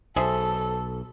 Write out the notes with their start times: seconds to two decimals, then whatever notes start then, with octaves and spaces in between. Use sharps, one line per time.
0.16 B1 G#4 A4 C5 E5